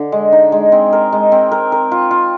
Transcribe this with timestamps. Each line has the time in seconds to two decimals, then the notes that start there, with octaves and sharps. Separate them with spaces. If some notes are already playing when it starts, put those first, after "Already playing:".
Already playing: D3
0.12 G#3
0.32 D#4
0.52 G#3
0.72 C4
0.93 A#4
1.13 G#3
1.32 C4
1.52 A#4
1.72 A#4
1.92 F4
2.11 F4